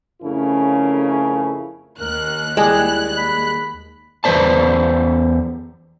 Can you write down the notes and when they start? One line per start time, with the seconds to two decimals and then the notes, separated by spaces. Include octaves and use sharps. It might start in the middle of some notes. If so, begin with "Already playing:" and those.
0.23 F2 C#3 A3 C#4 E4 A#4
2.00 D#2 A#4 F#6
2.57 G3 G#3 E4 G#4
3.18 B5
4.24 E2 B4 C5 D5 A5